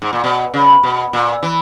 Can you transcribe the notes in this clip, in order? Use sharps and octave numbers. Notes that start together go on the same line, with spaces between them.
G#2
A#2
B2
C#3
B2
A#2
E3